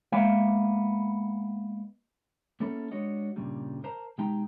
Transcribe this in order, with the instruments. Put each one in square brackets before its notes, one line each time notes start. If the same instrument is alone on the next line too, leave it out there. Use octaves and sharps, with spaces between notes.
[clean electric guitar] G#3 A#3 B3 E5 F5
A#3 B3 C#4 E4 A4
G#3 D4 F#4 C#5 D#5
G2 A#2 C#3 G3
A#4 C5 A5 A#5
B2 G#3 D#4 G4 G5 A#5